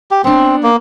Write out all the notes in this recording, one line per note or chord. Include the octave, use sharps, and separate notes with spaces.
G4
B3 C4 D4
A#3